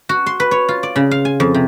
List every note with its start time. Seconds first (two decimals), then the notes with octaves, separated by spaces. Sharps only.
0.09 F#4
0.26 C6
0.40 B4
0.51 C#5
0.69 F4
0.83 D5
0.96 C#3
1.11 F5
1.25 G#5
1.40 F2
1.54 C3